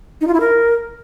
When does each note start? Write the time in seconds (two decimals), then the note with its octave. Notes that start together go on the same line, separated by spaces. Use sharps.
0.21 D#4
0.27 F4
0.34 E4
0.40 A#4